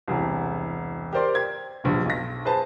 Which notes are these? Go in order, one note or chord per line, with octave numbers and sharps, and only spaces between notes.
E1 C2
G4 A#4 C5 D5 C6
G#6
A#1 G2 B2
B1 A#6
G#4 B4 C5 A5